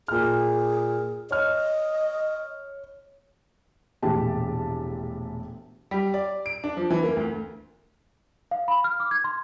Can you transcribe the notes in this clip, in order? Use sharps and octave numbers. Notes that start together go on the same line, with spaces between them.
A#2 G#4 F6
C#5 D#5 F6
E1 A#1 A2 G4 A5
G3
D5
D7
D4
F3
E3
A#3
D2
F5
B5
F6
D6
G#6
C6